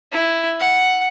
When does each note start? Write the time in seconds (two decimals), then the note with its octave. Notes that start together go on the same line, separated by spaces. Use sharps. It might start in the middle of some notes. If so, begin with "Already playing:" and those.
0.12 E4
0.60 F#5